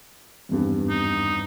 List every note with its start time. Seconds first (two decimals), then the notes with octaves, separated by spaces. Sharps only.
0.49 G#1 E2 G2
0.89 D#4